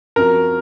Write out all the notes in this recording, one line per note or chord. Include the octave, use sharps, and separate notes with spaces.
F#2 F3 C4 F#4 A#4